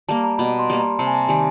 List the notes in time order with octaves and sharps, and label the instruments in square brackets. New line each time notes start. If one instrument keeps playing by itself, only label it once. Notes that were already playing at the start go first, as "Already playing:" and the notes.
[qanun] G3 A#3 [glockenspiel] A5
[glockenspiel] A#5
[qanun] B2 [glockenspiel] B5
[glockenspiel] C6
[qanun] G3 A#3
[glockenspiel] A#5
[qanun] C3 [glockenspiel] A5
[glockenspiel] G#5
A5
[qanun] D#3 G3 [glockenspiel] G#5